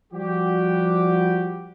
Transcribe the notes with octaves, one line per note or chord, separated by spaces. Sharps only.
F3 G3 F#4 G4